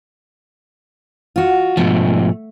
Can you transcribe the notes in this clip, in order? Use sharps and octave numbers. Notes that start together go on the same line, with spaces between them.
F4 F#4
G#2 B2 F3 A3